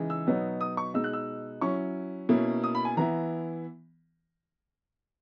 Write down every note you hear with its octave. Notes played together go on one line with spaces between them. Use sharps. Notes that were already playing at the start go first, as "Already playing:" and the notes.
Already playing: C#3 E3 G#3 D#4
E6
B2 F#3 B3 D#4
D#6
C#6
B2 G#3 D#4 E6
F#6
E6
F#3 C#4 E4 C#6
B2 A#3 C#4 E4
D#6
B5
G#5
E3 B3 E4 A#5